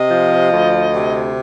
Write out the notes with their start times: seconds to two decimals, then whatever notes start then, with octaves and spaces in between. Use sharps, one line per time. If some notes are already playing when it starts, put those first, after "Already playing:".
Already playing: C3 D#5
0.11 F3
0.52 D2
0.92 C3